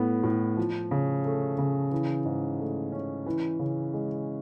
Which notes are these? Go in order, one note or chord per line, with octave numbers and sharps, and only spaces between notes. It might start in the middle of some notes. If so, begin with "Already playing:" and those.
Already playing: A2 B3
A2
F3
C#3
A3
C#3
E3
G#2
A3
C#4
E3
C#3
G#3